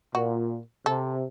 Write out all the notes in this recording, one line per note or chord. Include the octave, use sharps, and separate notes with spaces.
A#2 F#4
C3 A4